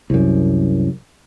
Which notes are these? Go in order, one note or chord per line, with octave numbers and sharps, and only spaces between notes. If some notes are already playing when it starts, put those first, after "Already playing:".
C2 F#2